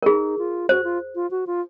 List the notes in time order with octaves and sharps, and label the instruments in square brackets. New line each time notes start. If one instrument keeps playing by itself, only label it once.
[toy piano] A#4
[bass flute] D#4 [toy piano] G#4
[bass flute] F4
[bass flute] F#4 [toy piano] C5
[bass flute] F4
F4
F#4
F4